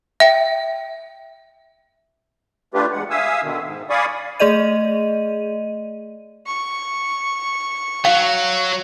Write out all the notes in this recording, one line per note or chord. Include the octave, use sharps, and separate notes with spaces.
E5 G5
A3 D4 F4 G4 B4
E2 G#3 F#5
E5 F5 G#5 D#6 E6
B2 D3 D#3
G#2
D5 F5 G#5 B5 C#6 D#6
A3 G#4 D5 D#5 D#7
C#6
F#3 F5